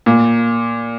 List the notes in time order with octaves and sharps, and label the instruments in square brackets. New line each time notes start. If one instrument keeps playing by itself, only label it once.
[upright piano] A#2